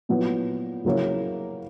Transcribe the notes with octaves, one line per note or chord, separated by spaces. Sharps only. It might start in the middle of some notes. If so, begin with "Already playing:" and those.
A#2 F#3 B3 E4
C#3 F#3 A#3 C#4 E4